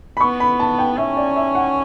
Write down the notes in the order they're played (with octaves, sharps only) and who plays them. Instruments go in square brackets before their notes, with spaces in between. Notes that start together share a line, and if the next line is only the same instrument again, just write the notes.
[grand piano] B5
[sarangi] B3 [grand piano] C#6
[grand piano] B5
A5
G5
[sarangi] C#4 [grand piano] E5
[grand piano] D5
E5
F#5